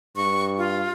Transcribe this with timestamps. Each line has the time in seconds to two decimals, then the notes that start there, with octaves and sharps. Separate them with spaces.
0.16 G2 C#6
0.58 F4